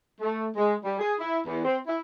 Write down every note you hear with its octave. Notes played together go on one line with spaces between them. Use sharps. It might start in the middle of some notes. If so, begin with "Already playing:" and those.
A3
G#3
G3
G#4
E4
E2
C4
E4